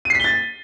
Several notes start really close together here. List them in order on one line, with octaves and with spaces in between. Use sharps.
D#7 C7 B6 G7 A6